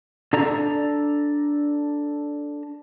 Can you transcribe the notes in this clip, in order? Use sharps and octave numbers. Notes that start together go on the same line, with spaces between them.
D4 A4 D5 A#5